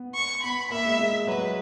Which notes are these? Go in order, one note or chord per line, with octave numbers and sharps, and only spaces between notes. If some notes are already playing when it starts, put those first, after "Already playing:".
Already playing: B3
C#6
B3 B5
A#3 E5
G#3
G#3
F#3 B4
G#3